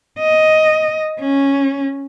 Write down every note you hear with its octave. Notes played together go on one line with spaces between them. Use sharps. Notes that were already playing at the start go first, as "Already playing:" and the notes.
D#5
C#4